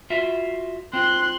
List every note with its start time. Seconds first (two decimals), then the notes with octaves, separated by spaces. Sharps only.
0.10 F4 F#4 E5
0.93 C4 F4 C6 F#6